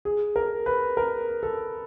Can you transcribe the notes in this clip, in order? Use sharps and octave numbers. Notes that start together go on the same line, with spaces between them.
G#4
A#4
B4
A#4
A4